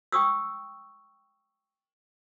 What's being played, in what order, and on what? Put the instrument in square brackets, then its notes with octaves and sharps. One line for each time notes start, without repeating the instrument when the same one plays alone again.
[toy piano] G5 C#6 D#6 E6